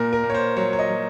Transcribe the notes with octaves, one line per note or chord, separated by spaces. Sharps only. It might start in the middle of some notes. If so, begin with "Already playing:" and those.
Already playing: A#2 A#4
A#4
A#2
C#5
C5
F#3 C#5
C#5
D#5
F#3